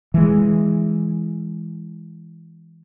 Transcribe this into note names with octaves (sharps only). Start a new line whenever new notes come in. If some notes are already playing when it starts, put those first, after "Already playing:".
E3 G#3